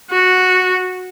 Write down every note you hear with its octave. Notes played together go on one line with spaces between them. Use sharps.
F#4